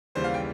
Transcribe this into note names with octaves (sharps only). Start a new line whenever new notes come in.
D#2 C#3 E3 G3 C5
F5
G5